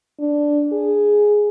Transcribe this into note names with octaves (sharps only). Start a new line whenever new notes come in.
D4
G#4